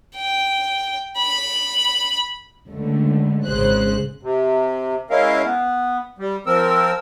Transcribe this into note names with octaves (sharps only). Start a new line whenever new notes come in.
G5
B5
C#2 D3 A3
G#1 C#2 C#3 G#4 C5 F#6
C3
G#3 C#4 E4 A#4 F5
B3
G3
F3 C4 A#4 E6